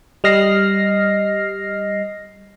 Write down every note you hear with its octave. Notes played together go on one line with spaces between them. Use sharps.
G3 D#5 F6 A#6 C7